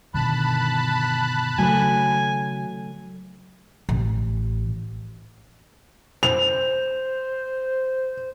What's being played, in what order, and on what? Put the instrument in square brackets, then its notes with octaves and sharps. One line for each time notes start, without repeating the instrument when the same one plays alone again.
[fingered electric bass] G2 B2 D3 [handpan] D#3 [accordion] A5 B5 F#6
[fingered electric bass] C#3 D4 [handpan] F#3 A3 [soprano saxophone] G#5
[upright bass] A1
[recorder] C5 [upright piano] F7